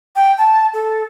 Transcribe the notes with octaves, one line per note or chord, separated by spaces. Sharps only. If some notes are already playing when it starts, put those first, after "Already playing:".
G5
A5
A4